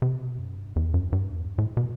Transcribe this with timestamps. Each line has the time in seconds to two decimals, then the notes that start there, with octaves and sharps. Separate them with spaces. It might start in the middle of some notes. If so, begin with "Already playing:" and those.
0.02 C3
0.20 B2
0.38 F#2
0.57 G2
0.76 E2
0.94 F#2
1.12 G2
1.31 E2
1.58 A2
1.77 B2